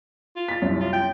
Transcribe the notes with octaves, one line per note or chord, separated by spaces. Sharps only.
F4
A6 B6
C2 F#2
F4
G5